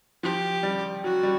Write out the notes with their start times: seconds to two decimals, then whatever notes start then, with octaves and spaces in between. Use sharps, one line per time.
0.23 F3 G4
0.63 G3
1.04 F#3 F#4
1.23 G3